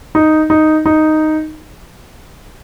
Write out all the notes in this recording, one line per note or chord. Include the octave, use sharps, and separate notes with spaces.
D#4
D#4
D#4